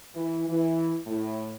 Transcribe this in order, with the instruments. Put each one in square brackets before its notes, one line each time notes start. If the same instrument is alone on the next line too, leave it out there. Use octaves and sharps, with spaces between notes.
[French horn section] E3
E3
A2